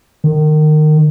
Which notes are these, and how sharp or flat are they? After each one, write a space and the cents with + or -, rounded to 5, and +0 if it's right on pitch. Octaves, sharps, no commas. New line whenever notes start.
D#3 -25